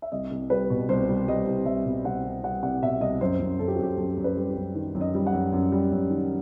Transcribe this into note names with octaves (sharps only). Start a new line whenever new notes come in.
E5
C2 D#5
C2
G3 B4
B2
C2 C5
G3
G3 D#5
C2
C2 E5
B2
C2 F#5
C2
G3 F#5
C2 F#5
B2 E5
C2 D#5
F#2 C5
F#2
F#2 A4
G4
F#4
F#2 G4
F#2 A4
F#2
B4
G3
G4
F#2
D#3
F#2
D#5
G3
F#5
F#2
F#2
G3
F#2
D#3